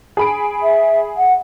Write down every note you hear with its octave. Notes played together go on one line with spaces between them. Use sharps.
G#4 B5 D7
E5
F#5